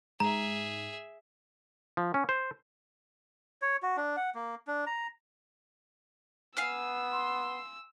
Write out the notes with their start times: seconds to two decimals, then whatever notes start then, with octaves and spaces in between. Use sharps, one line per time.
0.20 G#2 G#4 E5 A#5
1.97 F3
2.14 C#4
2.29 C5
3.62 C#5
3.82 F#4
3.97 D4
4.17 F#5
4.35 A#3
4.67 D4
4.87 A#5
6.57 B3 F5 G#5 E6 F6
7.11 C6